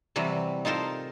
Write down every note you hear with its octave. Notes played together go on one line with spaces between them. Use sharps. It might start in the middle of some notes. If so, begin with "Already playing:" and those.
C3 E3 F#3 G3
D#4 F4 A4 A#4 C5